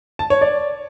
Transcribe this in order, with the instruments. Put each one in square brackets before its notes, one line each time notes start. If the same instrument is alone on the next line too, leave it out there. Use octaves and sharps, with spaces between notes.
[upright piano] A5
C#5
D5